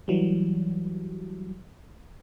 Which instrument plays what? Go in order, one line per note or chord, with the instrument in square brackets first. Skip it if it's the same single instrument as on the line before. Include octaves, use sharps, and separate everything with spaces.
[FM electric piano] E3 F#3 G3